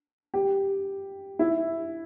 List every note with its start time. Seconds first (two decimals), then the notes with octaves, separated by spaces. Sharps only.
0.34 G4
1.39 E4